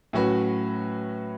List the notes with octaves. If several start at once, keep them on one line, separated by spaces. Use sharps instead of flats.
A2 F#3 C#4 F#4 B4